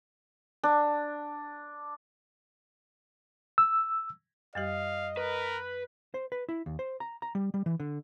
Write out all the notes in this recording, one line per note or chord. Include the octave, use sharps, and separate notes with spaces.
D4
E6
F#2 G3 G4 D#5 F5
A#4 B4
C5
B4
E4
D#2
C5
A#5
A#5
G3
G3
E3
D3